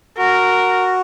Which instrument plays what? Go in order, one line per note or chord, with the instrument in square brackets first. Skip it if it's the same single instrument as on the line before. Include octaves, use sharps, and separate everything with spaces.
[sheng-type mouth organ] F#4 [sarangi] A#4